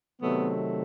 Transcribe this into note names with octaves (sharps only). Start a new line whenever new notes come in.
C3 D#3 F#3 A3 B3